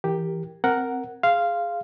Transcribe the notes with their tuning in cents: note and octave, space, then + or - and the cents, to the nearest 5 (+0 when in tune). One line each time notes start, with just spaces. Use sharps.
E3 +5 G4 +5 A#4 +0
C4 +0 A#4 +0 F#5 +0
G#4 +0 F5 -10 C6 +0